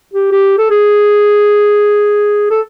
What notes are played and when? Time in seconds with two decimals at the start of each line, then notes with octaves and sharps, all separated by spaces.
0.14 G4
0.32 G4
0.58 A4
0.70 G#4
2.50 A4